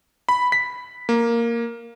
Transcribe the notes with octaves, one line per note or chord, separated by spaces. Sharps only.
B5
B6
A#3